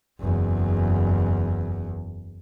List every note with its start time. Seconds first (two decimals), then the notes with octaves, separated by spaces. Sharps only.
0.20 F#1 E2